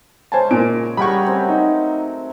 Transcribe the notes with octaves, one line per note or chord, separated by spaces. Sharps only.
C#3 G#3 C#4 C5 G#5 A5
A#2 A#4 D7
G3 G#4 A#4 F#5 G5 B5 C#6
F#3 A3 C4
D#4